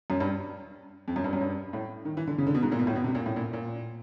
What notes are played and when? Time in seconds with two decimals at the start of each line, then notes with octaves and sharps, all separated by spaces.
0.10 F#2
0.20 G2
1.08 F2
1.16 F#2
1.24 G2
1.33 F#2
1.41 G2
1.73 A2
2.05 D#3
2.17 E3
2.27 D3
2.38 C#3
2.47 D3
2.55 B2
2.63 G#2
2.72 A#2
2.79 B2
2.87 A2
2.96 B2
3.04 C3
3.15 A#2
3.26 A2
3.36 A#2
3.53 A#2